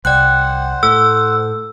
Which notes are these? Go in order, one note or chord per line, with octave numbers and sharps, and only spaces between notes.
C2 C5 D5 F#5 G5 F#6
A2 A4 E6